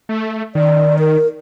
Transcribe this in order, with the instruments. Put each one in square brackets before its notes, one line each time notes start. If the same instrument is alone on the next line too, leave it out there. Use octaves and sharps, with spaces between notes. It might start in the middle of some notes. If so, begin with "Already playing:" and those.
[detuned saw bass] A3
[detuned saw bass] D#3 [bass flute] D5
[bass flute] A#4